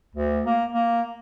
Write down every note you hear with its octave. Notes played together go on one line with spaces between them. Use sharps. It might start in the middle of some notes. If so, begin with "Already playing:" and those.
D2
A#3
A#3